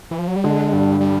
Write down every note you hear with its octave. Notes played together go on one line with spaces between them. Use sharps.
E3
F3
F#3
G3
D3 G#3
G2 G3
G3